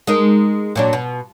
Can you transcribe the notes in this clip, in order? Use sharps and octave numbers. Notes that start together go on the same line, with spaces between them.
G#3 D#4 A#4
A#2 F#3 D4
B2